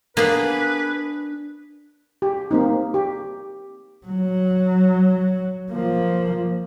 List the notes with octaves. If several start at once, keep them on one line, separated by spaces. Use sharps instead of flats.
A#3 B3 D4 G#4 B4
G4
A#3 C4 D#4
G4
F#3
F3 A#3